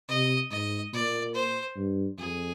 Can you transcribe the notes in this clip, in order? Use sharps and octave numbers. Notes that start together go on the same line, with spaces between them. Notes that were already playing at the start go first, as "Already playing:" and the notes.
C3 D#5
G#2 D#5
A#2 D5
C5
G2
F2 G#4